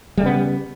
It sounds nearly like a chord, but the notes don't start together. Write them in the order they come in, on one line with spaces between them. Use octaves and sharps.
G3 A3 C#3 B3